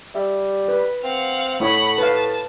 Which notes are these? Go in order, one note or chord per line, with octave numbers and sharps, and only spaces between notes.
G3 E5
B4
C4 F5 F#5
A2 A3 E4 C#5 F#5 B5
B4 F5 A5